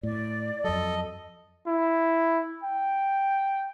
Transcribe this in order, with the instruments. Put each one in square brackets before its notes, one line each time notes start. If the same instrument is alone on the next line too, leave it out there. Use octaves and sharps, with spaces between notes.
[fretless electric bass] A2 [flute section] D5
[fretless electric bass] F2 F#3 [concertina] A4 [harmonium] D#5
[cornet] E4
G5